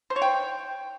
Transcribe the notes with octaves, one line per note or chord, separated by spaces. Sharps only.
C5
C#5
G5